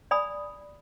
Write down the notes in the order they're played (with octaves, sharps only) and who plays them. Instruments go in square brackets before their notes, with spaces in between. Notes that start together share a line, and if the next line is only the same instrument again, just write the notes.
[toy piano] D5 G#5 B5 D#6